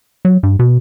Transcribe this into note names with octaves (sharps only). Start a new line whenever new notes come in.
F#3
G2
B2